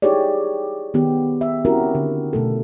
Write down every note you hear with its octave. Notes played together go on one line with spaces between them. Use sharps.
D#4 E4 G4 G#4 C#5 D5
D#3 B3 G4
E5
C4 C#4 E4 F#4 G4 A#4
D3
B2 A3 A4